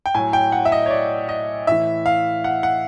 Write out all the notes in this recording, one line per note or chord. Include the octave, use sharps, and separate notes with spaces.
G5
A2 F#3 G#5
G5
F#5
E5
D#5
C#5
D5
D#5
A2 E3 E5
F5
F#5
F#5